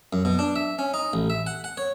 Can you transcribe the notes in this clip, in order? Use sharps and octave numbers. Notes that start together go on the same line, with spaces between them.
F#2
B2
D4
E5
C#4
D#4
A1
E5
F#5
F#5
C#5